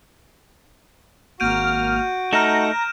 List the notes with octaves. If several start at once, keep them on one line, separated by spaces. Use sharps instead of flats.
G#1 A#3 F#4 F6 G6 D7 D#7
A3 D#4 A4 A#5 F6 A#6 E7